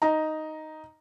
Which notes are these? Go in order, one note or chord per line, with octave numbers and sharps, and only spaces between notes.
D#4 A#5